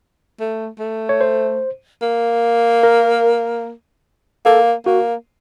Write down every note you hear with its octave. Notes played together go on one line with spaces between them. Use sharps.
A3
A3
C#5
C5
A#3
A#4
A#3 A4
A#3 F#4